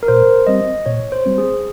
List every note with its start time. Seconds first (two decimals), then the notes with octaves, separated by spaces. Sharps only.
0.03 A#4
0.08 A#2 C5
0.47 G3 C4 D#5
0.86 A#2 C#5
1.12 C5
1.26 G3 C4
1.38 G#4